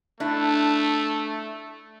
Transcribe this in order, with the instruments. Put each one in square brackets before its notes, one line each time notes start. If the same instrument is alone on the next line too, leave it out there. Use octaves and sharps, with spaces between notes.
[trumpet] A3 [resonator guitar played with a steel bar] D4 E4